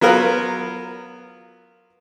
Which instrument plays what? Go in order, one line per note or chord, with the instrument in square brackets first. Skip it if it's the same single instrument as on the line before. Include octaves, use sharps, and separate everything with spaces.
[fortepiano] F#3 B3 F4 A#4 B4